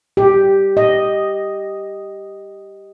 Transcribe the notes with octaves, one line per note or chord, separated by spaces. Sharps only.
G4
D#5